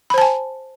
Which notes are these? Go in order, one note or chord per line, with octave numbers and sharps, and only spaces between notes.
C5 G#5 A5 B5